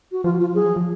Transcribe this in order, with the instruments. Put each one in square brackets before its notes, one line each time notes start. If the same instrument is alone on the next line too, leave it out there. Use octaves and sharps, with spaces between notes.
[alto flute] F#4
[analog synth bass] F3 [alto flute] F4
[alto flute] F4
[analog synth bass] F#3 [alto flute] G#4
[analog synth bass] F3
F3